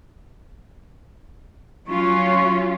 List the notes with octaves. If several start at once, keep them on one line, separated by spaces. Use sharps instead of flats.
F#3 C#4 F4 C#6